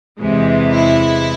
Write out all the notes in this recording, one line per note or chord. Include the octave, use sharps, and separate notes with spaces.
E2 C3 E3 G#3
E4